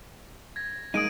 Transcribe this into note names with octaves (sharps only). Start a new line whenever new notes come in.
G#6 A#6
G#3 A#3 D#4 D#6 D7 D#7